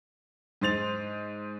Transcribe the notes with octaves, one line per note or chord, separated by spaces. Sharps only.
G#2 C5 A6 F7